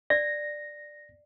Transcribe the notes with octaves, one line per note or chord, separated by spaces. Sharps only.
D5 A#6